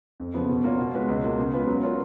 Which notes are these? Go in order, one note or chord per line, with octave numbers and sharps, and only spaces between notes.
F2
C#3 F3 B3
B2
A#3 F4 A#4 C#5
B2
G#3 C#4 F4 B4
C#2
B2 A#3 F4
C#3
G#3 B3 F4 B4
F#3
C#4 F4 A#4 C#5